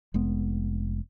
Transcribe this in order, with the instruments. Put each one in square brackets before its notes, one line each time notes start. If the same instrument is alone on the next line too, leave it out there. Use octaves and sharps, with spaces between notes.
[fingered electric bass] F1 G#3 B3